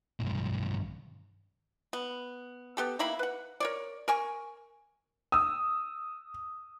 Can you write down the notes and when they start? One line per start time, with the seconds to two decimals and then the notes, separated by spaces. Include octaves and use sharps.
0.20 B1 G2
1.93 B3
2.77 B3 G4 A4
2.99 D#3 A#3 E4 B5
3.19 B4 F#5
3.60 A#4 C#5 D5
4.08 A#4 G#5 C#6
5.32 D#6 E6